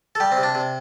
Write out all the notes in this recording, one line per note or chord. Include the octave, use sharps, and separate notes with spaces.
A4
G3 G4
C4
C3
D4
C3